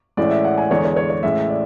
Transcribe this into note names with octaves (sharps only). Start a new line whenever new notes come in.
A1 A2 G#3 D5
E5
F#5
G#5
E2 D3 G#3 C#5
C#5
C#5
C#5
A1 A2 G#3 E5
D5